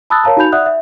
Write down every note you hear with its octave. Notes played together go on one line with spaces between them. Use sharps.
A5 B5 D#6 E6 F#6 A6
A#4 C#5 F5 A5 A#5
D#4 F#4 G#5 B5 G6 F7
D5 E5 F#5 D#6 F#6
E5